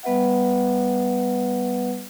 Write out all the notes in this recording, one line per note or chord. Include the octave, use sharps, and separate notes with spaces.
G3 B3 B4 E5 F#5